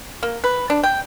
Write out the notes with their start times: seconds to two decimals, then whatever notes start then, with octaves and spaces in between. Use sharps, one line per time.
0.23 A#3
0.44 B4
0.70 D4
0.83 G5